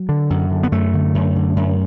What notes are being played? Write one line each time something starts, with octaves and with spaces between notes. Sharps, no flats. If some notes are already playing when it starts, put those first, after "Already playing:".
Already playing: F#3
D3
F#2
D3
B3
F#2 A3
D3
F#2
D3
F#2